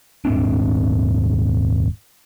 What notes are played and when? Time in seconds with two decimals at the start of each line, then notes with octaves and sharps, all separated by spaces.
0.25 D#1 G#2 C4 D4